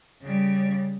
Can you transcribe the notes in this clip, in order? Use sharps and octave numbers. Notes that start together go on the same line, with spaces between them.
C#3 G3